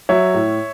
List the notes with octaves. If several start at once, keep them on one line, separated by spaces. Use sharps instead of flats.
F#3 C#5 E5
A2